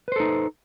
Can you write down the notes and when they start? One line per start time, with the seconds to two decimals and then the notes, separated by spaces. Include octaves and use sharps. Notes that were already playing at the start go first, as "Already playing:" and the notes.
0.08 B4
0.12 C5
0.16 A4
0.20 D#4